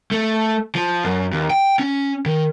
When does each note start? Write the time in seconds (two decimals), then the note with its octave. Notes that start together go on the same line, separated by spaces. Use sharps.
0.12 A3
0.75 F3
1.04 F#2
1.33 D#2
1.50 G5
1.79 C#4
2.26 D#3